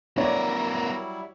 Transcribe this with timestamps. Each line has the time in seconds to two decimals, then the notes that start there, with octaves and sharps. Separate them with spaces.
0.18 F#3 G3 B3 D4 E4 A#4 C#5 D5